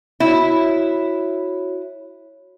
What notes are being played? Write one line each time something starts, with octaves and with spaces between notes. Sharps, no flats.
E4 F#4 C#5